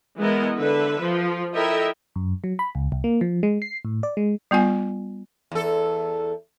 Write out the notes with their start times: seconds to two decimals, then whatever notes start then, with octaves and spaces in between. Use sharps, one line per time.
0.18 E3 G#3 B3 E4 A#4 D#5
0.57 D3 A4 B4 E5
1.01 F3
1.54 E4 A4 A#4 D#5 E5 G5
2.16 F#2
2.44 F#3
2.59 B5
2.75 C#2
2.92 C2
3.04 A#3
3.21 F3
3.43 G#3
3.62 C7
3.85 A2
4.03 D5
4.17 G#3
4.51 G3 B3 F4 G#5
5.52 E2 A4